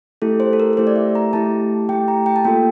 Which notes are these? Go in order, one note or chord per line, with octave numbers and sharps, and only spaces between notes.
A3 E4 G4 A4
C5
A4
A#4
A#4
A3 E4 G4 C5
D5
E5
A#5
A3 E4 G4 A5
A3 E4 G4 G5
A#5
G5
A5
A#3 F4 A4 G5